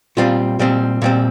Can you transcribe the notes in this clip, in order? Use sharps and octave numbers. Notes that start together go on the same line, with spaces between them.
A#2 G3 C4 F4
A#2 G3 C4
A#2 G3 C4